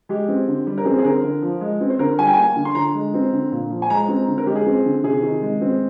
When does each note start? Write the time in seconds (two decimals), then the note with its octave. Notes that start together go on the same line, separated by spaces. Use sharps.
0.09 G#3 G4
0.28 C4
0.48 D3
0.67 G3
0.78 A#4
0.85 C4 G#4
0.99 G#4
1.04 D3 A#4
1.24 D3
1.42 F3
1.61 G#3
1.81 C4
1.90 C5
1.99 D3 A#4
2.19 G3 G#5
2.27 G5
2.33 A#3 G#5
2.56 D3
2.65 C6
2.75 D3 A#5
2.95 G#3
3.14 C4
3.33 D3
3.52 A#2
3.70 F3
3.82 G#5
3.90 G#3 A#5
4.09 C4
4.28 D3
4.38 A#4
4.46 G#3 G4
4.56 G#4
4.66 C4
4.85 D3
5.04 C3 G#4
5.22 D#3
5.42 G#3
5.61 C4